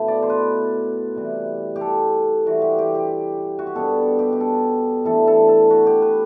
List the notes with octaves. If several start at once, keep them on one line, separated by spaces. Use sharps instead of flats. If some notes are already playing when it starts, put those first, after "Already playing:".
Already playing: B2 A3 E4
D5
C5
B4
C3 E3 G3
G4
A4
E3 G3 C4 E4 F#4
G4
G4
G4
F#4
G4
B2 G3 B3 D4 A4
G4
G4
A4
E3 A3 D4 A4
A4
A4
F#4
G4
B4